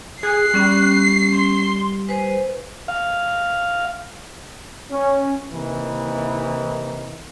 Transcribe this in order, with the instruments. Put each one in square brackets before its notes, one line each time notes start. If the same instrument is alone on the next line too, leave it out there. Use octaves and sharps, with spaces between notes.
[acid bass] G#4 [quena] F#6 [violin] C7
[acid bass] G3 [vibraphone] B3 C#4
[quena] C6
[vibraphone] B4 C5 [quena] G#5
[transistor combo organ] F5
[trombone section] C#4
C3 D#3 E3 A#3 D#4